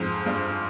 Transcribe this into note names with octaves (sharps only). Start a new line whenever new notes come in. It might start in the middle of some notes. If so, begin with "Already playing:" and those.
Already playing: F2 G#2
G2